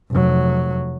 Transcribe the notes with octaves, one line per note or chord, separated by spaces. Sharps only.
F1 F#3